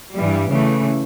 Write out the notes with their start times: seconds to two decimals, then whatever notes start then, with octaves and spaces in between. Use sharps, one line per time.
0.15 G2 E3 G3
0.51 C#3 E3 A3